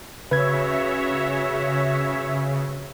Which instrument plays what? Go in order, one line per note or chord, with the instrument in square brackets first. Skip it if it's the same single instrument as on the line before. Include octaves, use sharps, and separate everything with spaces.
[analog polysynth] C#3 [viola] F#4 [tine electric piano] B4 G#6 [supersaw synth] C#5 E5